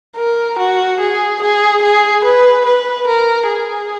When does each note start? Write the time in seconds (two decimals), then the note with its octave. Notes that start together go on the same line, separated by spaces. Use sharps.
0.16 A#4
0.58 F#4
0.99 G#4
1.41 G#4
1.82 G#4
2.24 B4
2.65 B4
3.07 A#4
3.48 G#4